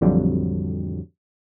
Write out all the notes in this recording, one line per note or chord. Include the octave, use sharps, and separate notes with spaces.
A1 F2 D3 F#3 G3